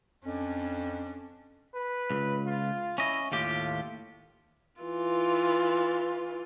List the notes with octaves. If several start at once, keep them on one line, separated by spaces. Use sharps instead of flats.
F2 C#4 D4
B4
C#2
F4
C#4 E4 D#5
D#2 A2 F4 G4
E3 F4